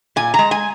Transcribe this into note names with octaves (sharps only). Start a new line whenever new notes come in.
A#2 G#5
G#3 A#5
G#5